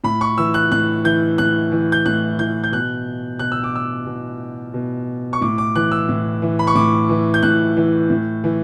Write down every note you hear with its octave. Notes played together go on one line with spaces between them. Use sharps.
A2 B5
C#6
E3 E6
F#6
A2 F#6
E3 G6
A2 F#6
E3
G6
A2 F#6
E3 G6
G6
B2 F#6
B2 F#6
E6
D6
E6
B2
B2
C#6
A2 D6
D6
E3 F#6
E6
A2
E3
B5
C#6
A2 D6
E3
G6
A2 F#6
E3
A2
E3